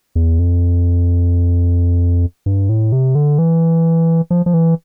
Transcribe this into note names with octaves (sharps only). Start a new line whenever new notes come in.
E2
F2
G2
A2
C3
D3
E3
F3
F3
E3